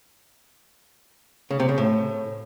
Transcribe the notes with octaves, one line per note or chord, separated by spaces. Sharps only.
C#3
C3
C#3
A2